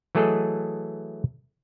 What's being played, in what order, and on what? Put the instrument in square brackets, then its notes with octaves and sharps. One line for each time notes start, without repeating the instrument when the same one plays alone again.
[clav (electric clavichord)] E3 F#3 A3 G#4 A4 D#5